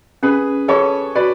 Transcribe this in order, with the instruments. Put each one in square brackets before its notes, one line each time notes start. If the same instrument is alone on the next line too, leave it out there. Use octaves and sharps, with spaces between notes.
[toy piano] C#4 [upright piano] G#4 B4
[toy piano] F4 G#4 B4 [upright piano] A4 C#5
[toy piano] F#4 [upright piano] B4 D5